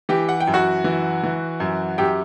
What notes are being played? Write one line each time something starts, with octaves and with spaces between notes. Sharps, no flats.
E3 G4 G5
F#5
G5
F#2
F#4 F#5
E3
E3
F#2
F#2 G4 G5